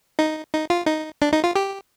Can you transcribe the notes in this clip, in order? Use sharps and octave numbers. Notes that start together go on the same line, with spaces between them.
D#4
D#4
F4
D#4
D4
D#4
F4
G4